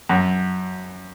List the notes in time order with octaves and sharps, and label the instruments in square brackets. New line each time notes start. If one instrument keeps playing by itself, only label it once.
[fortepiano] F#2